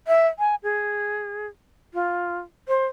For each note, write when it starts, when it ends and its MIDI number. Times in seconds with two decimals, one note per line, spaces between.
0.07 0.27 76
0.39 0.55 80
0.63 1.47 68
1.94 2.39 65
2.68 2.85 72